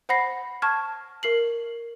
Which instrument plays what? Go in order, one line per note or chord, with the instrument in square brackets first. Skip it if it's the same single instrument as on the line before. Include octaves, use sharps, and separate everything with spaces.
[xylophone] C5 F#5 B5 A#6 C7
A5 C#6 F6 G#6
A#4 C7 F#7